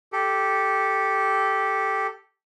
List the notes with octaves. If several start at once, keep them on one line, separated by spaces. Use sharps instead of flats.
G4 A4